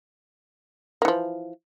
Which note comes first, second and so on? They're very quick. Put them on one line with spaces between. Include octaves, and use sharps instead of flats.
A#3 E3 F3